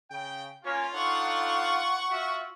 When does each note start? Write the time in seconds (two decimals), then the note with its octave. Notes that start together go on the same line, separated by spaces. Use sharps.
0.11 C#3 G5
0.65 A#3 C#4 F4 C#5
0.94 D4 D#4 A4 F#5 C#6
2.11 F4 F#4 E5